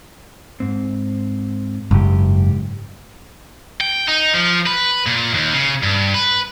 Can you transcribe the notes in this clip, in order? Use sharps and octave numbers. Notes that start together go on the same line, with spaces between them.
G#2 C4
F#1 G#2 G4
G5
D#4
F3
B4
A#2
D#2
C#3
G2
B4